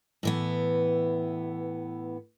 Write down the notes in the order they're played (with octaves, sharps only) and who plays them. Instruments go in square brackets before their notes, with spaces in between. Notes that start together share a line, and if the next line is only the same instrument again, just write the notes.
[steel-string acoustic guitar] A2 E3 B3